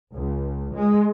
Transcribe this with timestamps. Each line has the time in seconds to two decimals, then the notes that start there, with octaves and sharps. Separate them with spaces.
0.13 C#2
0.74 G#3